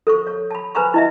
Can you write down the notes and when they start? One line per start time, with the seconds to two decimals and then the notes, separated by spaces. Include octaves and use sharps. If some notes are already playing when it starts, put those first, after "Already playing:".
0.07 A4 C5 C#6
0.27 C#5
0.51 A5 B5
0.75 B4 C5 G#5 A#5 B5 C#6
0.94 E4 D#5 E5